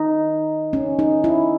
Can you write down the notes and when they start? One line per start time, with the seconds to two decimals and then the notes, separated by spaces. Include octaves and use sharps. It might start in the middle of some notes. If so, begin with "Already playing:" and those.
Already playing: D#4
0.73 C#4
0.99 D#4
1.24 E4